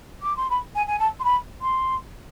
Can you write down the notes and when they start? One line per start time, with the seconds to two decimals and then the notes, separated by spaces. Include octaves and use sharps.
0.22 D6
0.36 C6
0.49 B5
0.75 G#5
0.87 G#5
0.99 A5
1.19 C6
1.24 B5
1.61 C6